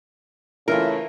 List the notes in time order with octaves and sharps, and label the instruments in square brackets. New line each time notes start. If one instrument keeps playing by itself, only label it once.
[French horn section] C#3 A3 E4 [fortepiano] E3 A#3 F4 [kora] A#4